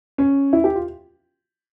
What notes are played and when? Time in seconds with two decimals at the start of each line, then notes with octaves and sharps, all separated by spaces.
0.18 C#4
0.53 E4
0.64 G4
0.75 F4